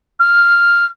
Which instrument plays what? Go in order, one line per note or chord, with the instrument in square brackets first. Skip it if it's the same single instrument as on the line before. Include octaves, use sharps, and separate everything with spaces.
[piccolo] F6